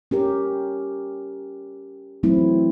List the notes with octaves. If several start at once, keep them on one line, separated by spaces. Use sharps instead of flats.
C#4 G4 A#4
E3 F#3 A3 C4 E4